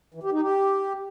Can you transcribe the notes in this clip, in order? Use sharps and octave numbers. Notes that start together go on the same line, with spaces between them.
E3
G4
D#4
G4